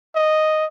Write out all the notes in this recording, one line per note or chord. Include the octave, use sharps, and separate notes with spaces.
D#5